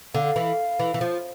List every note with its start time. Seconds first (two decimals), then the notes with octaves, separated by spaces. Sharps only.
0.15 D3 F5
0.36 E3
0.79 E3
0.94 E3
1.01 F3